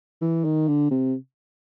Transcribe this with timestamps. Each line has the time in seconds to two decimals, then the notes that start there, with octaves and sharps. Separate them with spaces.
0.21 E3
0.44 D#3
0.68 D3
0.91 C3